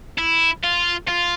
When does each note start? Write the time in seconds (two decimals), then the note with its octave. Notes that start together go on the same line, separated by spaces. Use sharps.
0.18 E4
0.64 F4
1.08 F4